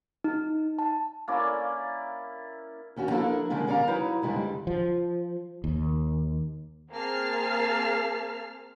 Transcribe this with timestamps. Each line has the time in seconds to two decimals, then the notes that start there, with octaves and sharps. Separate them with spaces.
0.24 D#4
0.79 A5
1.28 A#3 C#4 E4 D5
2.96 D#2 C#4 D4 F#4
3.10 F3 A#3 D4 E4 A4 A#4
3.50 D3 G3 G#3 A#3 C#4 D4
3.67 C#4 A#4 D5 F5 A#5
3.87 F#3 D#4 E4 B4
4.22 F2 D3 G3 G#3 E4
4.67 F3
5.64 D#2
6.92 A#3 C4 G#4 A5 F6 C7